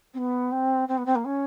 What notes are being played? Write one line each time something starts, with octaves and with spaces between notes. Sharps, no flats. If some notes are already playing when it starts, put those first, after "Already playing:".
C4
B3
C4
C4
B3
C4
A#3
C#4